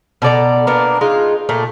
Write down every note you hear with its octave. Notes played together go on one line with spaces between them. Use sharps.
B2 A4 D5 A#5
A#3 B3 D4 A#4
G#3 D#4 F4
A#2 A3